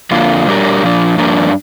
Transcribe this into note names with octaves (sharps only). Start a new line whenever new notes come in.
F2 D3 A#3 F4
A#2 G3 D4 G4 A#4
A#2 F3 D4
G2 F3 A#3 D4 A#4